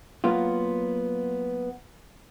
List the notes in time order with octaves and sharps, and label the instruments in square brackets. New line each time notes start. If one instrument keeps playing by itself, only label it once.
[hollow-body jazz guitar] F#3 A#3 B3 F4